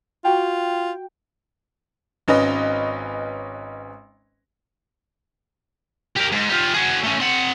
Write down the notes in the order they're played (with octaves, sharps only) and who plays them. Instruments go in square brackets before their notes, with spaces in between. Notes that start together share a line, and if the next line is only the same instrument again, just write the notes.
[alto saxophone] F4 [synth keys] F#4 G5
[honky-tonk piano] G#1 C#4 B4 D#5
[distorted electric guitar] G4 A#4
G#2
F4 G4
F#4 G#4
A3 C#4
C4 F#5